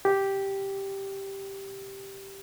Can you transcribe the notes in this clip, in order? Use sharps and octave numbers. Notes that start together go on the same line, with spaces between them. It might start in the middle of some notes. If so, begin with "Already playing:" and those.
G4